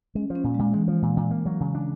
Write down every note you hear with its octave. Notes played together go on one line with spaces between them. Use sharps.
G#3 C#4
F3
C#4
A#2
A#2 G#3
E3 G#3
F3
A#2
A#2
A#3
F#3
C#3
D4